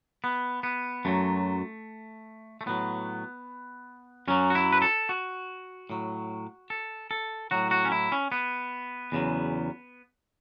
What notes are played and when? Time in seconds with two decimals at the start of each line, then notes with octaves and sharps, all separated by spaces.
0.24 B3
0.63 B3
1.05 F#2 F#3 A3
2.61 A3
2.66 A2 F#3 B3
4.28 F#2 F#3 C#4
4.50 F#4
4.55 E4
4.72 B4
4.82 A4
5.09 F#4
5.90 A2 F#3
6.70 A4
7.11 A4
7.51 A2 F#3 F#4
7.71 F#4
7.85 C#4
7.92 E4
8.12 C#4
8.32 B3
9.12 E2 C#3 F#3